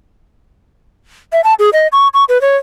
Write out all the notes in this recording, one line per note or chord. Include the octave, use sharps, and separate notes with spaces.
E5
A5
G#4
D#5
C#6
C#6
B4
C#5